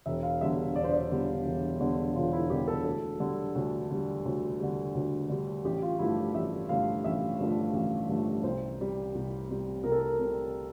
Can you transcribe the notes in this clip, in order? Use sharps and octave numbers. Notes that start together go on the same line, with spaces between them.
E1 E5
F5
E2 D3 G3 E5
E1 D5
C5
D5
E2 D3 G3
E1
E2 D3 G3
E1 F4
E4
E2 D3 G3 G4
A4
D2 A4
D3 G3
D2
D3 G3
D2
D3 G3
D2
D3 G3
A1 G4
F4
G2 D3 F3 A3 E4
A1 E5
G2 D3 F3 A3 F5
A1 E5
G2 D3 F3 A3
A1
G2 D3 F3 A3
C2 C5
C3 G3
C2
C3 G3
C2 A#4
A4
A#4
C3 G3